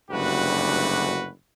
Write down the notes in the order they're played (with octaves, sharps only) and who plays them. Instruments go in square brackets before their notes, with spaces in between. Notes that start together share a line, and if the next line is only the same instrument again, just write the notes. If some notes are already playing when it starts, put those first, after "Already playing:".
[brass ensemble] F#1 D2 G2 F#4 B4